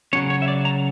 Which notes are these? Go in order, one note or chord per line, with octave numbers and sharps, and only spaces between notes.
C#3 F#3 C#4 C#5
C#5
E5
D5
A#5